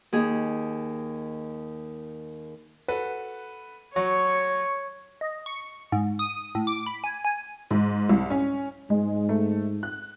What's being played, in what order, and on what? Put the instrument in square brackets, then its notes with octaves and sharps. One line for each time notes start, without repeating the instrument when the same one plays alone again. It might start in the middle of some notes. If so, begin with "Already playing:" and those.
[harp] D#2 G#4
[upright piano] F#4 A4 B4
[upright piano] F#3 [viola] C#5 [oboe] C#6
[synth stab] D#5
C#6
G#2
D#6
A2
D6
B5
G#5
G#5
[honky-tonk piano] G#2
C2
C#4
[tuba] G#2 [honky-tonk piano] G#3
[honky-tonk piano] A3
F#6